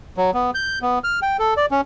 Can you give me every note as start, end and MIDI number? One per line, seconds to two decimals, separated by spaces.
0.17 0.31 54
0.34 0.51 59
0.55 0.79 91
0.82 0.99 59
1.04 1.20 89
1.22 1.37 79
1.39 1.54 69
1.57 1.66 74
1.71 1.81 61